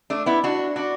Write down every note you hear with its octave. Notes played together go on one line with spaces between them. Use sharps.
A3 D4
B3 E4
D4 F#4
D4 F#4